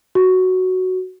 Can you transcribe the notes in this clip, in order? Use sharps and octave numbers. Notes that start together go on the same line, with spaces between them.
F#4